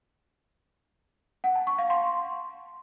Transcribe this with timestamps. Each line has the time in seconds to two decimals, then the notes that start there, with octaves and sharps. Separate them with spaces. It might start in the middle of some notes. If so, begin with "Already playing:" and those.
1.44 F#5
1.55 A5
1.67 C#6
1.78 F5
1.90 C6